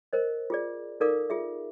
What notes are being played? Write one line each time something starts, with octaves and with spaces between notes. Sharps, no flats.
A#4 C5 D#5
F4 G#4 D5
D#4 A4 A#4 D5 F5 D6
F4 G#4 E5